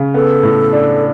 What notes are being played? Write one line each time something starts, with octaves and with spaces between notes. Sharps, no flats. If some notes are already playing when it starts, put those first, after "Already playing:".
Already playing: C#3
B3 A4
A2
D4